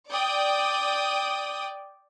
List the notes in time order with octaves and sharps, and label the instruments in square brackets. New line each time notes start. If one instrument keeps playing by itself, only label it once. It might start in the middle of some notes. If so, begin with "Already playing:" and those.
[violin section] D5 G5 D#6